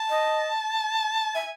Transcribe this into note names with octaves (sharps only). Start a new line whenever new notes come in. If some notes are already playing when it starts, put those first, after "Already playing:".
Already playing: A5
D#5
E5 G#5